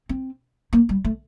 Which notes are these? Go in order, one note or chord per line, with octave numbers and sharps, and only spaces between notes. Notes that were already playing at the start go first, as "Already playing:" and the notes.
C4
A#3
G3
A3